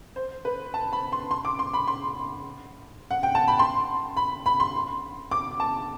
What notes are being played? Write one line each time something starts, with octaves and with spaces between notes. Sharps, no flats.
C5
B4
A5
B5
C6
C6
D6
C6
B5
C6
F#5
G5
A5
B5
C6
B5
B5
C6
D6
A5